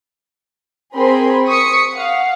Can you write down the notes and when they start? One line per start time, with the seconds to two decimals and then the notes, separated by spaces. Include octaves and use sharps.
0.94 C4 G#4 A#4 B5 C6
1.46 C#6 D#6 B6 C#7
1.93 F5 F#5